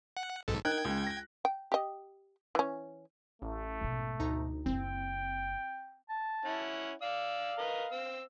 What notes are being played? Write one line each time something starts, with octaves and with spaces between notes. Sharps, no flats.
F#5
B1 G#2 A4
D#4 A#4 G5 F#6 G#6
C#2
A#6
G5
G4 D#5
E3 C#4
A1 A3
G#2 B2
D2 D#4 A#5
F#1 C4 E4 G5
A5
C#4 E4 F#5
D5 F5 E6
A#4 B4 D#5
C4 E6